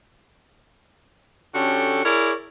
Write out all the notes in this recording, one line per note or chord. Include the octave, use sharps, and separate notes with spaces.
D3 C#4 F#4 G4 A4
E4 G#4 A#4 C#5 D5